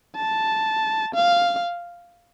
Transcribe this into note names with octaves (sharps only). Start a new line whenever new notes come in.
A5
F5